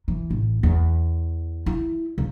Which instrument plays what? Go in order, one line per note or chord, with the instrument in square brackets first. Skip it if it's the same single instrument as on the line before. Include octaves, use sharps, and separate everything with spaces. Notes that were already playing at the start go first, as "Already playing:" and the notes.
[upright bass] E3
A1
E2
E4
C#2